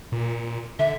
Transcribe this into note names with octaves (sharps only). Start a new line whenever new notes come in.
A#2
D3 E5